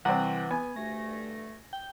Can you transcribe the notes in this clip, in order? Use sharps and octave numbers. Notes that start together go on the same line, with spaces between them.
C2 E3 C4 F#5
B3 G#5
D2 G2 A3 A#6
G5